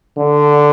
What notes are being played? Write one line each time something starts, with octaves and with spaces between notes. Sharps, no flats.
D3